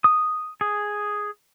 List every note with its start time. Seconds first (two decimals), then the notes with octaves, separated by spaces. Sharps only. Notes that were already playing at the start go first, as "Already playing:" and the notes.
0.04 D#6
0.61 G#4